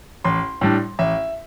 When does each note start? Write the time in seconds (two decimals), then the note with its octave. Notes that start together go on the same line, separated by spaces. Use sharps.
0.24 A1 C6
0.61 A2 G3 D4
0.99 A1 E5